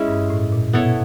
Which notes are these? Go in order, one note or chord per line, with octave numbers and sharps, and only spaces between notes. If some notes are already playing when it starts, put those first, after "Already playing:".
Already playing: G#3 C#4 E4
G2
A2
A#2
B2 B3 E4 A4 C#5